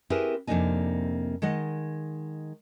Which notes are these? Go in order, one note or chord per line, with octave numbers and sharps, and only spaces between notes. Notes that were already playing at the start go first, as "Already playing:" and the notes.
C4 E4 G4 G#4 A#4 B4
F2 C3 A#3 D4 D#4 G#5
D#3 G#3 D#5 F#5